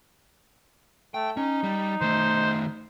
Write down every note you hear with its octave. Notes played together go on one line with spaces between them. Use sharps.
A3 G5
C#4 D#4
G3
D#3 A3 C5